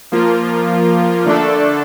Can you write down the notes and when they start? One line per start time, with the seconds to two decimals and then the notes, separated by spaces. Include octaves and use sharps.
0.12 F3 A#3 F4
1.25 D3 A3 D4 A4